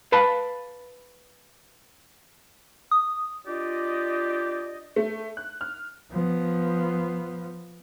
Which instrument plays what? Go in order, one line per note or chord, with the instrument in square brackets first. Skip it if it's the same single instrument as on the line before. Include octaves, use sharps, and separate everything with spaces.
[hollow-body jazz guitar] B4 F5 A5 B5
[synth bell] D#6
[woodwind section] D4 F4 G4 D5 D#5
[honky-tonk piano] A3
F#6
F6
[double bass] F3 B3